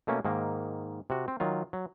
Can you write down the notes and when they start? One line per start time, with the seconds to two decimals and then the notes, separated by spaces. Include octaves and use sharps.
0.07 B2 A3 A#3 C#4
0.25 G#2 D#3 A#3
1.10 C3 F#4
1.28 C4
1.40 D#3 F#3 F4
1.73 F#3